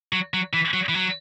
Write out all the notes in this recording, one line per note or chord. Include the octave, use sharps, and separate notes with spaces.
F#3
F#3
E3
F#3
E3
F#3